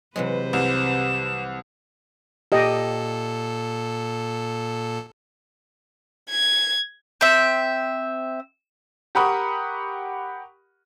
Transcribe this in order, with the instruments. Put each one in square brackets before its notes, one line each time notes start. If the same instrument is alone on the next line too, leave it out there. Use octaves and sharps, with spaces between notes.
[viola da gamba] C3 B4 C5 [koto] E3 F#3 G#3
[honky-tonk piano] C2 [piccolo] E7
[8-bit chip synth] A#2 A4 [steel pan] G4 D#5 G5
[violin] G#6
[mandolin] C4 E5
[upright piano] G4 A#4 F#5 B5 C#6 D#6